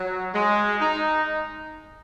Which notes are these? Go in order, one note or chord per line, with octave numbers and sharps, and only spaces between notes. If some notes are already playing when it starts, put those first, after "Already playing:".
Already playing: F#3
G#3
D#4